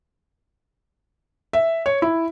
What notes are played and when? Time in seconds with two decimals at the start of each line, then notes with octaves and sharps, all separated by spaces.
1.53 E5
1.86 C#5
2.02 E4